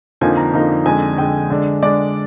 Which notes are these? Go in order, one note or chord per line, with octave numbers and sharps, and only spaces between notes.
F2 D3 F3 A#3 D#4 G#5
A#5
F2 D3 F3 A#3 D#4
F2 D3 G#3 G#5
F2 D3 G#3 G5
D3 G#3 D4
D3 G#3 D4 D5